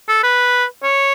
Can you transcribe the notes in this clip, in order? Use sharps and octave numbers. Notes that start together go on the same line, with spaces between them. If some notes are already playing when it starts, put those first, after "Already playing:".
A4
B4
C#5